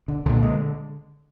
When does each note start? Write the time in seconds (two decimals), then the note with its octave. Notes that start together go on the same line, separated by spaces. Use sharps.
0.08 D3
0.25 C2 A#2 D3
0.43 G#3